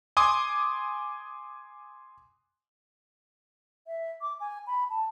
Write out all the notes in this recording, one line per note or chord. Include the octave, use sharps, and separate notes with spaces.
G#5 C6 D6 D#6
E5
D6
G#5
B5
A5